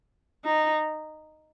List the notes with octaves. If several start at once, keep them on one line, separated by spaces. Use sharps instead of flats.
D#4